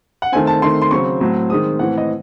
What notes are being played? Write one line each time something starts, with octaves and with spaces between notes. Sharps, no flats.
F#5
D#3 A3 C4 G#5
A5
D#3 A3 C4 C6
C6
C#3 F#3 C4 C#6
A2 F#3 C4
D#3 G#3 C4 D#6
A2 E3 C4 F#5
D#5